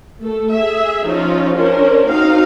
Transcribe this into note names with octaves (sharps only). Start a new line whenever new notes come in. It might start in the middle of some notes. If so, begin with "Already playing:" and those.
A3 A4
G#4 E5
F3 C#4 D#4 F4
C#4 D4 A#4 C5
C4 D#4 F#4 F5